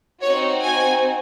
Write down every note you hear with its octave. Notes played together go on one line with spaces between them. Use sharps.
C4 D#4 F#4 C#5
G#5